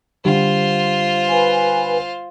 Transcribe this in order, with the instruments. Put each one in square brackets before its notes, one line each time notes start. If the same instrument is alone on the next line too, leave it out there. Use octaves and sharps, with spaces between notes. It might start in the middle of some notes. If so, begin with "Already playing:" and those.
[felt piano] D3 G3 [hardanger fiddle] F4 C5
[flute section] B4 G#5